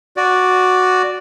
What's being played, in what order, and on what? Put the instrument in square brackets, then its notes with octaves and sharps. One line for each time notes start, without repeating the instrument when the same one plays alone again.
[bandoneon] F#4 D5